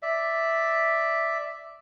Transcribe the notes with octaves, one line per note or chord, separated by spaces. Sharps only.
D5 E5